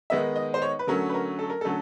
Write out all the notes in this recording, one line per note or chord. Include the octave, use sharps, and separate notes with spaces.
D#3 G#3 B3 D#4 E5
D#5
C5
C#5
B4
D3 F#3 A3 C#4 A#4
B4
A#4
A4
A#4
D3 F#3 A3 C#4 A4